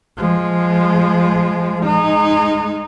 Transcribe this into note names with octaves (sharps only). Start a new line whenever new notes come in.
F3 G#3
G#3 D#4